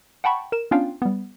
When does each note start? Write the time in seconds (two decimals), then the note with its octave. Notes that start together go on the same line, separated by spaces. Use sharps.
0.24 F#5 G5 A5 B5 C#6
0.52 A#4 E7
0.71 B3 C#4 D4 F4 F5 G5
1.02 G3 B3